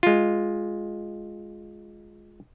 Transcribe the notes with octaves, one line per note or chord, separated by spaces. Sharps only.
G#3 F4